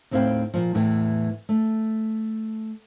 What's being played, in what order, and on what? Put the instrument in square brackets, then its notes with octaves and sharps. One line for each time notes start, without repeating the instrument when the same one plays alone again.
[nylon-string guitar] D#2 A2 C4 E4 F5 G5
A#2 F3
E2 A2 E3 G5
A3